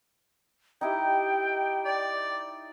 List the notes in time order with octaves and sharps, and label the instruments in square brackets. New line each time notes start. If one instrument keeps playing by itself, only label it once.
[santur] D#4 E4 G4 [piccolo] G5
[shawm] D5